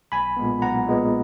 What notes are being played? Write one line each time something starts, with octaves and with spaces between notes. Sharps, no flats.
B1 G#5 B5
A#2 G#3 B3
B1 F#5 A#5
A#2 G#3 B3